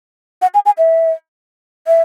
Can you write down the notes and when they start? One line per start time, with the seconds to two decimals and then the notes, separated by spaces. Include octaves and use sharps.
0.42 F#5
0.54 G#5
0.66 G#5
0.78 E5
1.87 E5